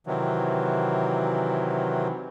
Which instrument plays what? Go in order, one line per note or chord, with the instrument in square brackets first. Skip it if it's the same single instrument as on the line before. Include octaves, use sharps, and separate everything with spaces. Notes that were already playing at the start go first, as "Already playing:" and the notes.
[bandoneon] C3 D#3 E3 F#3